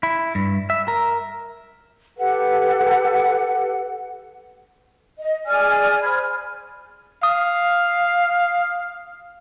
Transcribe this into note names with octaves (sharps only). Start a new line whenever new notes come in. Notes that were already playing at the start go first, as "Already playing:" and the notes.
E4
G2
E5
A#4
G4 A4 B4 F#5
D#5
G#4 D5 G#5 F6
C5 B5 F6 G#6
F5 D#6